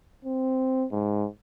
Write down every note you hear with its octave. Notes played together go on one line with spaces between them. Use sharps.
C4
G#2